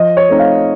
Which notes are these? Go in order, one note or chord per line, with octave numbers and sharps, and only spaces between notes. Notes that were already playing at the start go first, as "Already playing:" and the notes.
Already playing: F3 D#5
C#5
A3 C4 D#4
F5